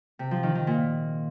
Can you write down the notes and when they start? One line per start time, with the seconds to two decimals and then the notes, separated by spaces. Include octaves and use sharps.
0.19 C3
0.31 F3
0.43 D#3
0.55 D#3
0.67 A#2